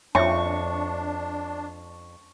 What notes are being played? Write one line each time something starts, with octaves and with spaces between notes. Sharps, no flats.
F2 D4 C#5 E5 C#6